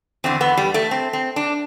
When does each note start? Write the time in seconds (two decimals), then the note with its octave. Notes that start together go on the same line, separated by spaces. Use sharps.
0.24 E2 D3 C4
0.41 B3
0.57 G3
0.74 A3
0.91 C4
1.13 C4
1.36 D4